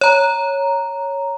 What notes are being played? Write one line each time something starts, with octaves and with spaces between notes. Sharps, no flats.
C#5 A#5